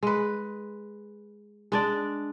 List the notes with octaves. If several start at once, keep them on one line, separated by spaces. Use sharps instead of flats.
G#3 B4
G#3 D4 D5